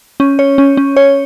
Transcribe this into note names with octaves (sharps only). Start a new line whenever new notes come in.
C#4
C#5
C#4
C#4
C#5